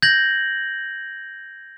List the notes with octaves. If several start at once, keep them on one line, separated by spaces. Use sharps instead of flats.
G6 G#6 A#6 F#7